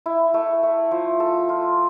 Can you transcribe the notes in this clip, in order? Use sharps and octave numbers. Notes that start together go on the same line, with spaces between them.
E4
A3
A3
F3
A4
F4